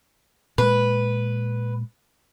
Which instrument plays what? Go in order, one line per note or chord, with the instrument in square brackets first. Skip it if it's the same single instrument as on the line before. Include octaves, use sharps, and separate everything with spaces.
[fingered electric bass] A#2 G#3 [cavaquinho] B4